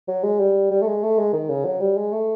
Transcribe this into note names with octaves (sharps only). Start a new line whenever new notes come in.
F#3
G#3
G3
G3
A3
G#3
A3
G#3
D#3
C#3
F#3
G3
G#3
A3